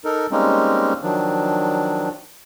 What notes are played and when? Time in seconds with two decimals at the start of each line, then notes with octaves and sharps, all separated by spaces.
0.05 D#4 A4 A#4
0.31 G3 G#3 A#3 C4 C#4 D#4
1.02 D#3 F3 F#3 D4